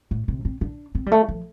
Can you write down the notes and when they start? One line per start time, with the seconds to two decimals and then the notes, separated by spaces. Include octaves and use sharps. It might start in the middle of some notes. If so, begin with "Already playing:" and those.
0.11 A2
0.28 C3
0.45 C4
0.61 D4
0.95 C4
1.06 G3
1.12 A3
1.29 F3